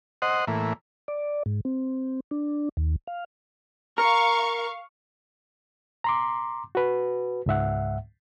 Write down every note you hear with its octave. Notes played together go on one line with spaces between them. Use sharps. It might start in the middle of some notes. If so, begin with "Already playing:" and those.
C5 D#5 F#5
A2 E3 A#3
D5
G#2
C4
D4
D#2
F5
A#4 F5 C#6
A#5 C6 D6
F#4 B4
C#2 G#2 E5 F#5